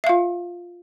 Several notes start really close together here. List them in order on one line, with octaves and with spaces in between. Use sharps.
E5 F5 F4